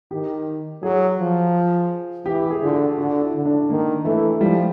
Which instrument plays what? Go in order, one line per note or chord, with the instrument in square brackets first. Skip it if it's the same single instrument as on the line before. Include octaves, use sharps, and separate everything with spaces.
[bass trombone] D#3 [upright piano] G4
[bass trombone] F#3 [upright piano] G#4
[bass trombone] F3
[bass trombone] E3 [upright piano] G4
[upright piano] G#4
[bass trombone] D3 [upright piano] F4
[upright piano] F#4
[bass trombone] D3 [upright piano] F#4
[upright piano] E4
[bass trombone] D3
[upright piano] D4
[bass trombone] D#3 [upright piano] A#3
[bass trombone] E3 [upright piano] A3
[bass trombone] F3 [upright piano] G3